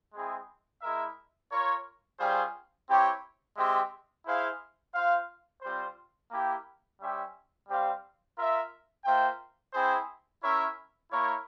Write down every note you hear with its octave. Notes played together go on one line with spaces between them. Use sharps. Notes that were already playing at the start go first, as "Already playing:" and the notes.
G#3 C4 E4 G#4
G#3 E4 A#4 E5
F4 A#4 C#5
G3 C#4 F4 G#4 C5
C4 E4 G4 C#5
G#3 C4 G4 C5 E5
E4 G#4 C5 F5
F4 C5 F5
G3 C4 F4 C5
A#3 E4 G4
G3 C#4 G4 C5 E5
G3 C4 G4 C5 F5
F4 A#4 E5
A#3 F4 C5 E5 G5
C4 E4 G#4 C5
C#4 E4 A#4 C#5 E5
A#3 E4 A#4 C#5